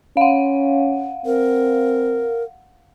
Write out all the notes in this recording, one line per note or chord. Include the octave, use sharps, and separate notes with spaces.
C#4 F5 F#5
C4 A#4